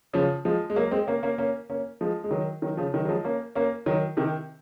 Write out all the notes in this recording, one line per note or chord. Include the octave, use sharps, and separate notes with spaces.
C#3 F3
F3 G#3
G#3
F#3 A#3
G#3 C4
A#3 C#4
A#3 C#4
A#3 C#4
A#3 C#4
F3 G#3
G#3
D#3 F#3
D#3 F#3
C#3 F3
D#3 F#3
F#3
F3 G#3
A#3 C#4
A#3 C#4
D#3 F#3
C3 D#3